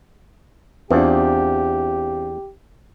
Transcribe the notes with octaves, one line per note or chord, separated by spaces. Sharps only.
E2 C4 D4 F4 G4